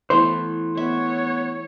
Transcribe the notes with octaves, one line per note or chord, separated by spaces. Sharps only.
E3 A3 B3 C5
B3 C#5 E5